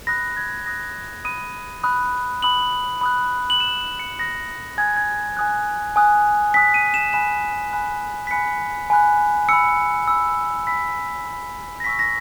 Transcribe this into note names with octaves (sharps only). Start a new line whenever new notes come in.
B5 D#6 F#6 A#6
G#6
B5 D#6 F#6 A#6
B5 D#6 F#6 D#7
B5 D#6 F#6
B5 D#6 F#6 F#7
B5 D#6 F#6
F#7
B5 D#6 F#6 E7
C#7
B5 D#6 F#6 A#6
G#5 D#6 F#6 G#6
G#6
G#5 D#6 F#6
G#5 D#6 F#6
G#5 D#6 F#6 B6
D#7
E7
G#5 B5 F#6 E7
G#5 B5 F#6
B6
G#5 B5 F#6 C#7
G#5 B5 F#6
B5 E6 C#7
B5 E6
B5 E6 B6
B5 E6
A#6
G#5 C#6 E6 B6
A#6